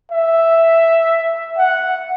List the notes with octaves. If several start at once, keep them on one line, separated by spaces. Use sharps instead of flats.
E5
F#5